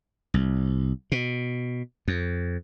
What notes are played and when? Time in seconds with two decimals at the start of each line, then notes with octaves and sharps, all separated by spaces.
0.34 C2
1.12 B2
2.08 F2